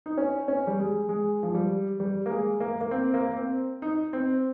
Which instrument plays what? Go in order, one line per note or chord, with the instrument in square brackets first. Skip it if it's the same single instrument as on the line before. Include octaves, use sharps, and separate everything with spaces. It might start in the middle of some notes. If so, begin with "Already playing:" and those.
[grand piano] D#4
C#4
C#4
G3
G#3
G#3
F3
G3
G3
A#3
G#3
A#3
A#3
C4
A#3
C4
D#4
C4